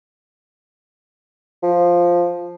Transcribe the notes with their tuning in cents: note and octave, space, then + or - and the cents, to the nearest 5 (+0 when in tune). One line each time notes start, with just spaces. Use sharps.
F3 +0